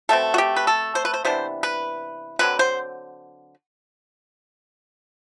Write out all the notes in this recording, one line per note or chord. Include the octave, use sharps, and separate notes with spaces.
B2 A3 C4 A4
F#4
G4
B4
A4
C5
B4
C5
C3 E3 B3 D4 C5
B4
D3 F#3 C4 B4
C5